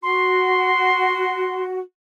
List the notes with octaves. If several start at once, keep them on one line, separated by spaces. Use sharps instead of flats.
F#4 C6